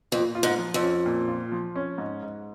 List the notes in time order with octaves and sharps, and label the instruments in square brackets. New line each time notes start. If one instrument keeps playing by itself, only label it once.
[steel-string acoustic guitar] F2 [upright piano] A#2
[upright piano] F4
[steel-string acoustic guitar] G#2
[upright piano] F3
[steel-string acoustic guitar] F2
[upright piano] C#4
A#2
F4
F3
C#4
G#2
G#2